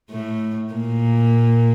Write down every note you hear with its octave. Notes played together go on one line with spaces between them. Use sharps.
A2 A3
A#2 A#3